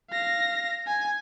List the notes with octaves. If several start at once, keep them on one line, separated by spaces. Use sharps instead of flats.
F5 A#6
G#5